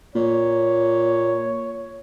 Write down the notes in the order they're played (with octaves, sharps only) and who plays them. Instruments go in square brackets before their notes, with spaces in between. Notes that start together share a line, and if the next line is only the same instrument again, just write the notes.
[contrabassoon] A#2 [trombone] C#5